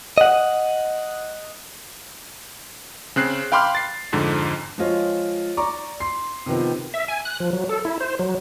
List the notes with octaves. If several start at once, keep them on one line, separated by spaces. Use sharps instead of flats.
D#5 F#5
C#3 C4 F#6 C7
F5 G5 B5 C6 D6 F6
A6 C7
F2 G#2 D3
F3 G#3 F4 C#5
D5 A#5 C#6 D6
C6 C7
C3 D#3 F3 B3 C4
E5
G#5
F#6
F3
F#3
A4
E4
C5
F#3